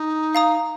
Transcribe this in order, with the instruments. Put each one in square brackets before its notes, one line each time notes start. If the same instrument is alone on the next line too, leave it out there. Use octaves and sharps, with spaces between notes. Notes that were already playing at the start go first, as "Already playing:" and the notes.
Already playing: [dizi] D#4
[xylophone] F5 A#5 D#6